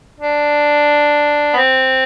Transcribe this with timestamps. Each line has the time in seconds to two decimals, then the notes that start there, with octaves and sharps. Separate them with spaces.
0.20 D4
1.53 B3
1.57 C4